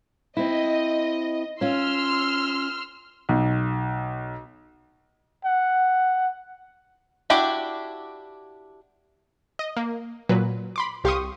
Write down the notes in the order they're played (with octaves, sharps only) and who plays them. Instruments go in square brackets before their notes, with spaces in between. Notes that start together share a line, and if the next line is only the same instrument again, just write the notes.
[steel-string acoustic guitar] C4 E4 [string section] D#5
[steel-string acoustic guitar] C#4 F4 [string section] C6 E6 F6
[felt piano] B1
[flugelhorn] F#5
[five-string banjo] D4 E4 F#4 G4
[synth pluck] D#5
A#3
A#2 F#3 B4
B5 C6 D6
C2 G4 F5 C6 C#6 D#6